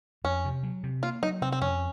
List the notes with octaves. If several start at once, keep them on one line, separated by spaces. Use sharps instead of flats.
F2 C#4
C3
F#3
C3
A#3 F4
F#3 D#4
C3 C4
C4
F2 C#4